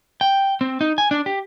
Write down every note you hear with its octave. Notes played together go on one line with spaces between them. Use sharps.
G5
C4
D#4
G#5
D4
G4